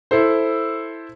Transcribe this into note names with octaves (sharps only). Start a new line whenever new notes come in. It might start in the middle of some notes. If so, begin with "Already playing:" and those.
E4 A4 C5